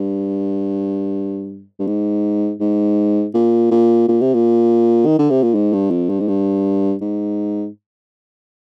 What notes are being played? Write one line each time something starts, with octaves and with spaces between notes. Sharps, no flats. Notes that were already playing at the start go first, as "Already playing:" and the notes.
Already playing: G2
G2
G#2
G#2
A#2
A#2
A#2
C3
A#2
D#3
D3
C3
A#2
G#2
G2
F2
G2
G#2
G2
G#2